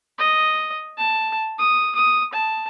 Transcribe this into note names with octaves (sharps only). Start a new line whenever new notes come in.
D#5
A5
D#6
D#6
A5